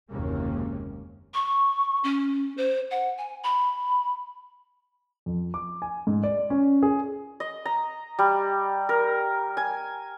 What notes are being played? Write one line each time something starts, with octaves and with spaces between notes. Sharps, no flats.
F#1 D#2 C3 G#3 A#3 C#4
C#6
C#4
C5
F#5
G#5
B5
F2
D6
G#5
G#2
D5
C#4
G#4
D#5
A#5
G3
A#4
G#5